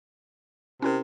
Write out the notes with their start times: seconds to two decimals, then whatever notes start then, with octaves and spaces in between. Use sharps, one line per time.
0.82 C3 C#4 E4 A#4